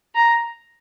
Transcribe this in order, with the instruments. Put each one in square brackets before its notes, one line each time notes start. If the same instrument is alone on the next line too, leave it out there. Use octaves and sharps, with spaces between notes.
[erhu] A#5